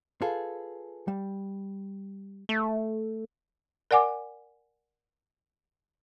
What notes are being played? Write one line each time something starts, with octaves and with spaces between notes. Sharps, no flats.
F4 G#4 A4 B4
G3
A3
A#4 D5 F#5 G#5 D6